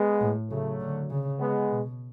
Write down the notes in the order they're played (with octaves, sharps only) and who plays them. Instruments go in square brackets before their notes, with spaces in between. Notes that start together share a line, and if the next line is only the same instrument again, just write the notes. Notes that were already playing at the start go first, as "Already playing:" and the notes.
Already playing: [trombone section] G#3 B3
[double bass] A2
[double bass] C#3 [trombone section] F#3 A3
[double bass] D3
C#3
[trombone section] G#3 B3
[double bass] B2